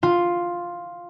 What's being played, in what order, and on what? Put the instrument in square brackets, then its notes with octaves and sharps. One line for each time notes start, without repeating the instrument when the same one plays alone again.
[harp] F4